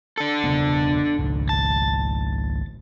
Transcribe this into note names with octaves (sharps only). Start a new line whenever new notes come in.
D4 A4
E1 C#3 B3
G#1 C#2
A5